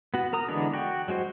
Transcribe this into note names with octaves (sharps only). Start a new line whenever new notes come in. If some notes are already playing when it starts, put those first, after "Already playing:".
B3 F#4
A#4 A#5 D#6
D3 E3 G#3 B3 D4
F#4 G5
F#3 G#3 F#4 C5